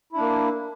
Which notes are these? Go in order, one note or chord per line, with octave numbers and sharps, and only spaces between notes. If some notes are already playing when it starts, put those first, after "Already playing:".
A#3 D4 E4